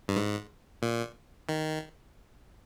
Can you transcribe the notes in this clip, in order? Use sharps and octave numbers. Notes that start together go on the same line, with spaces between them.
G2
G#2
A#2
D#3